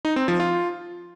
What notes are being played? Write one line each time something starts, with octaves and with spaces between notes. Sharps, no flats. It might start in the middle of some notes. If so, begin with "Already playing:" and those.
D#4
C4
F3
F4